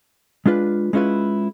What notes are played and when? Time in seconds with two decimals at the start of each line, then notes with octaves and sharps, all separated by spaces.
0.46 G#3 D4 F4 B4
0.93 G#3 C#4 E4 F4 B4